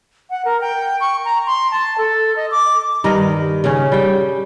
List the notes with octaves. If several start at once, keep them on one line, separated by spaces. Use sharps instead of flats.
F#5
A#4
G5
C#6
A#5
C6
A5
A4
D#5
D6
G2 D#3 A#4 D#5
C#3 C#4
G3 G5